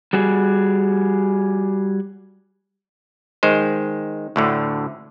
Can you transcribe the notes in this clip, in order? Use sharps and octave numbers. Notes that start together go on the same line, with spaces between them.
G3 F#4 G#4
D#3 G#3 C5
D2 A2 D3